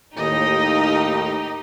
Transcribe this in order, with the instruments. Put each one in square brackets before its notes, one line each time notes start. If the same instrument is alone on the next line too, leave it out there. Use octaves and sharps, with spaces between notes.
[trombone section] D#2 A2 [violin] D#4 G4 [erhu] D#5